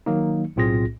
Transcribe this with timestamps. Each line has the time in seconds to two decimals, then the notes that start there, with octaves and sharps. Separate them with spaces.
0.06 D#3 F#3 A#3 D#4
0.56 B1 A2 C4 F4 G#4 A#6